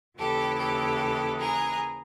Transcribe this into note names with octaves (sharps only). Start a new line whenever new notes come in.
D#2 C#3 E3 G4 A4
G4 A4
G#4 A#4